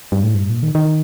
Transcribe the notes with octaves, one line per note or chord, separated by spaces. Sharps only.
G2
A2
G2
A#2
D#3
D#3